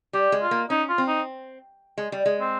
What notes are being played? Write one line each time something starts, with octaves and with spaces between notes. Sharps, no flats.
G3 G4
G#3
F4
A#3
C#4 D#4
F4
C4
D#4
G#3
G3
G#3
C4